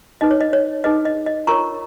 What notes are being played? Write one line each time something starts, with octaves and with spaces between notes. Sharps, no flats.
D#4 G#4 B4 D#5
C#5
D#5
C#5
D#4 G#4 B4 D#5
D#5
D#5
F4 A#4 C#5 A#5 C#6